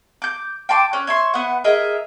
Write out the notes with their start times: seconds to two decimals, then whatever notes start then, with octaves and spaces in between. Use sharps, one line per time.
0.22 D6 G6
0.69 G5 A5 C6 D6
0.93 C#4 F#6
1.07 C#5 E5 C6
1.34 B3 F#5
1.64 G#4 A#4 D#5 E5